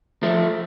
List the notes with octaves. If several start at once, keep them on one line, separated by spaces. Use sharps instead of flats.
F3 A3